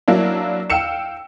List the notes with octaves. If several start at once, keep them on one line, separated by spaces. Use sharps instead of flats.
F#3 A#3 D4 E4
F5 G5 E6 C#7 E7